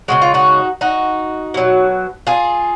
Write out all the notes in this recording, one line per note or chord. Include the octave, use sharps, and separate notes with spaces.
C#3 F3 G#3 F#4
F4
D#4 F#4
D#4 F#4
B2 F#3
F4 G#4